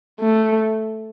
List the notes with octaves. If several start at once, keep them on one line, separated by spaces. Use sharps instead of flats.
A3